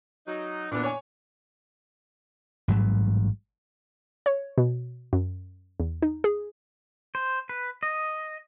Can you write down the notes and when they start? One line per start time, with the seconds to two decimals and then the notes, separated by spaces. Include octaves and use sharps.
0.27 F#3 D#4
0.71 A#2 D3 E3 B3 D4
0.83 C#5 G#5
2.68 A1 G#2 F#3 G3
4.26 C#5
4.58 B2
5.13 F#2
5.80 E2
6.02 D#4
6.24 G#4
7.15 C5
7.49 B4
7.83 D#5